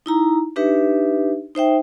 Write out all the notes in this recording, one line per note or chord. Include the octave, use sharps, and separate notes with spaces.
D#4 E4 A#5
D4 D#4 G4 B4 E5
D#4 C5 E5 G5